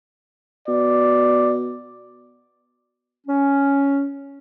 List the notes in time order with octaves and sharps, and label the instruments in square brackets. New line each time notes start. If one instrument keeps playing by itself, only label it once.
[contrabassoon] B2 [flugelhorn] D5
[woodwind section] C#4